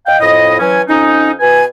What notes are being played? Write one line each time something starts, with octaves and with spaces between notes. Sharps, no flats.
D#5 F5 G5
F2 A2 D#5
E3 F#3 C#4 G#5
F2 C#4 D#4
B2 B4 G#5